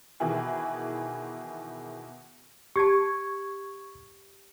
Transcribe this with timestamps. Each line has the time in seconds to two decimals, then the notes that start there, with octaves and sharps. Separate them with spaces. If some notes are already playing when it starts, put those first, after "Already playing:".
0.20 B2 D#3 E3 E4 G#4
2.76 G4 A5 C#6 G#6